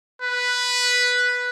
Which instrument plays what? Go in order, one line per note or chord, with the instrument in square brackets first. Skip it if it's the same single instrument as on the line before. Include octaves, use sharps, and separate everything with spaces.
[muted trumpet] B4